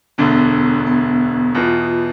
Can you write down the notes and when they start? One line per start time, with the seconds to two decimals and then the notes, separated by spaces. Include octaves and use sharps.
0.18 E1 D2 D3 B3
0.87 B3
1.55 E2 B2 B3 F4